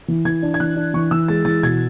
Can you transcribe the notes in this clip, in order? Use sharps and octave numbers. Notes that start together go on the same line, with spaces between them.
E3
E3 G#6
D4
G#6
E3 F#6
D4
E3 C#6
E3 E6
G#3 A6
E3 A6
B2 G#6